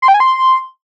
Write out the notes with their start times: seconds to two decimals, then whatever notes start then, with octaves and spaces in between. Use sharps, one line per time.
0.02 C6
0.08 G5
0.14 G#5
0.20 C6